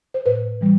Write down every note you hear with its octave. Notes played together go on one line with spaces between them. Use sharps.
C5
A2 B4
E3 G3